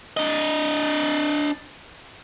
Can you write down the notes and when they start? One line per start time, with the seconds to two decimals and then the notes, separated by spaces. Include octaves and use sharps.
0.17 D4 D#5